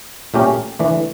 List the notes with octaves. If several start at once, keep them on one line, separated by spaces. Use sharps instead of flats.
A#2 A3 C#4 G4 A#4
E3 A3 D4